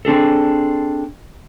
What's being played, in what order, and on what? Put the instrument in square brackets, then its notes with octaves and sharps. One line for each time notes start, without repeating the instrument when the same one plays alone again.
[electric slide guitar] C4 D4 G#4 A4